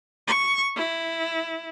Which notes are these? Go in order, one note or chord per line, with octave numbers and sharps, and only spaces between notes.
C#6
E4